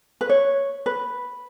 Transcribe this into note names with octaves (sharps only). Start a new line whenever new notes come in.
B4
C#5
B4